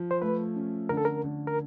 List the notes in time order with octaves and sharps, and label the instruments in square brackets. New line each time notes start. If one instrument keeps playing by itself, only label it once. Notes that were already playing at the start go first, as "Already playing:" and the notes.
Already playing: [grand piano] F3
[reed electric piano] C5
[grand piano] A3 [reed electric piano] B4
[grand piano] C#4
[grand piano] D3 [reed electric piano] A#4
[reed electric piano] A4
A#4
[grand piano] D3
[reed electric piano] A#4